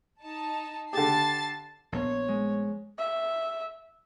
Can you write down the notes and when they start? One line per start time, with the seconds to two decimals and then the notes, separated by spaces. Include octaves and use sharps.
0.22 D#4 A5
0.93 D3 G4 A5 A6 C7
1.92 A#1 B3 C5 C#5
2.28 G#3
2.98 E5